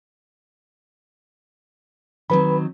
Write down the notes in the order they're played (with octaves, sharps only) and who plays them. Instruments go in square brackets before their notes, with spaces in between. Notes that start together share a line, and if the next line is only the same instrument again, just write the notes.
[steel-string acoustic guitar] D#3 F#3 C4 [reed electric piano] B4 B5